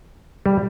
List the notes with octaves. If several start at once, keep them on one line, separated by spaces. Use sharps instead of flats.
G3